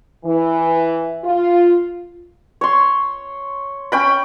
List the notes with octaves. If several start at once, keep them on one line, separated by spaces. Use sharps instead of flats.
E3
F4
C#5 C6
C#4 G5 B5